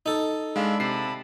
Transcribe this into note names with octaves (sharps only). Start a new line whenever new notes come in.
D#4 A4
G#3 D4 F5 B5 E6
C3 A5 B5 C7